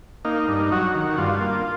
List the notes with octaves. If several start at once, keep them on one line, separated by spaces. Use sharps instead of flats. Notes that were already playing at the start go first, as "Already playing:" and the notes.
A#3 D#4
G2
F#3 F#4
D#3
G2 F4
A#3